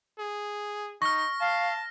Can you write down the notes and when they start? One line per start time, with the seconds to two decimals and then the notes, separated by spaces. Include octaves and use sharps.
0.19 G#4
1.02 D#4 C#6 F6 A#6
1.40 F5 A5